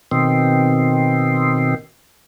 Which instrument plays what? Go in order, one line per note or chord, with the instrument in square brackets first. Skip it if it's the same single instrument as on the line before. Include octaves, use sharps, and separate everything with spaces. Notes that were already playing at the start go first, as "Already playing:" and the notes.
[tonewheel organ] B2 D#3 C4